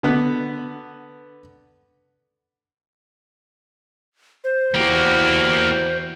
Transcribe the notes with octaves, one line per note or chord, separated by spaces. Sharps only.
D3 B3 B4
C5
E2 A#3 E4 F#4 G4